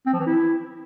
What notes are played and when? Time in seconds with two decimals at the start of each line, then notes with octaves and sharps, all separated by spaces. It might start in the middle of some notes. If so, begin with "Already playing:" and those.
0.06 C4
0.13 F3
0.20 E3
0.27 E4